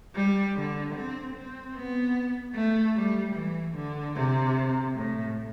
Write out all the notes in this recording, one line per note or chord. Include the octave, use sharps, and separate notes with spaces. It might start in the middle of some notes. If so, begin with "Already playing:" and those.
G3
D3
C4
C4
B3
A3
G3
E3
D3
C3
A2